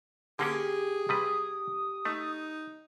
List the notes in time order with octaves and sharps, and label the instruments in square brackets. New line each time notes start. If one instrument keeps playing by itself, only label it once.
[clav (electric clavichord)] D3 A#3 C#4 [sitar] G4 [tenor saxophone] G#4
[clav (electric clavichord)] C3 G3 B4 [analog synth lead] D#6
[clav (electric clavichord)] A3 [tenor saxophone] D#4